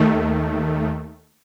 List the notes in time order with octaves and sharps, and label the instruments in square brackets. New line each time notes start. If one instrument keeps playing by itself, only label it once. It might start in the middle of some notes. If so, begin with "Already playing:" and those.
Already playing: [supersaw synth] D#2 D#3 A3